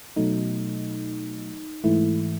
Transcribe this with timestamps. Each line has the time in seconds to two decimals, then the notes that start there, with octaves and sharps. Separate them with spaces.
0.16 B2 F#3 A3 D#4
1.84 G#2 E3 A3 E4